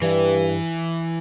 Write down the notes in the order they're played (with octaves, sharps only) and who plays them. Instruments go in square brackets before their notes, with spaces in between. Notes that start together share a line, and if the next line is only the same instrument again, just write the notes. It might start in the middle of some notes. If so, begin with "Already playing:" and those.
[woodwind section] G2 [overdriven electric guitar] E3